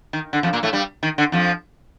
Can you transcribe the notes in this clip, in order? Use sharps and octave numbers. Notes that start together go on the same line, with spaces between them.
D#3
D3
F2 F3
A#2 A#3
A2 A3
G2 G3
D#3
D3
F2 F3